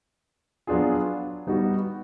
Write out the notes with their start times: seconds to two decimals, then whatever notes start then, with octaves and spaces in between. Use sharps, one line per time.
0.67 F#3 B3 D4 F4 G#4
1.47 G3 B3 D#4 F#4